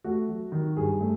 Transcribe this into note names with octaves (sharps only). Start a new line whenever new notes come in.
A3 F#4
F#3
D#3
G2 G#4
A3